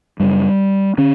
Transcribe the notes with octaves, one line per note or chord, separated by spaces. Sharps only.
F#2 C#3 G3
D3 C#4